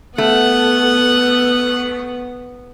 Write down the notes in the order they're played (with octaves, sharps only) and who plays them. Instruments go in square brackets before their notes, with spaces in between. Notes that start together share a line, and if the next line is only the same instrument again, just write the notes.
[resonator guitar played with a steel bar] A3 [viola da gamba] B3 [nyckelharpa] F#5